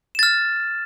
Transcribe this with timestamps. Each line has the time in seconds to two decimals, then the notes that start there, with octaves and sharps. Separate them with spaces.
0.15 E7
0.19 A6
0.23 F6